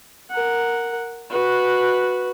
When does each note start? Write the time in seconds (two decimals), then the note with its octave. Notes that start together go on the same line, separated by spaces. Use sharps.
0.31 A#4 F#5
1.30 F#4 B4